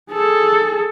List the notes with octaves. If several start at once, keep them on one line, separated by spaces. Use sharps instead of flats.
G#4 A4